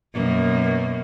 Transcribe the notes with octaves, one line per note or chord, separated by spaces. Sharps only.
F#2 B2 A#3